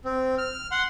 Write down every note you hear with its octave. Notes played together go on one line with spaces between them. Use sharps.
C4
F6
F#5 C6